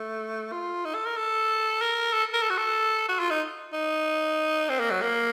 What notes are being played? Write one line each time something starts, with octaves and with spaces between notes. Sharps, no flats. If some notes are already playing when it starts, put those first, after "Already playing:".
Already playing: A3
F4
D#4
A4
A#4
A4
A#4
A4
A#4
A4
F#4
A4
F#4
F4
D#4
D#4
C4
A#3
F#3
A#3